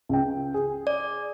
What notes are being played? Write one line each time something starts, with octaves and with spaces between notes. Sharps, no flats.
C#2 G5
G#4
D5